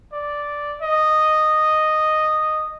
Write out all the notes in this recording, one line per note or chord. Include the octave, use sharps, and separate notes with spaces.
D5
D#5